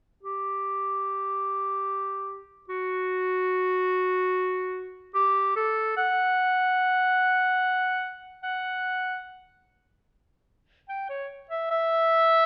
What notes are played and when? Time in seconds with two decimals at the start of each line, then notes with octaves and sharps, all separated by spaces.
0.23 G4
2.69 F#4
5.15 G4
5.56 A4
5.97 F#5
8.43 F#5
10.89 G5
11.09 C#5
11.51 E5
11.71 E5